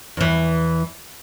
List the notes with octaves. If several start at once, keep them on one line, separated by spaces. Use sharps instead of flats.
E2 E3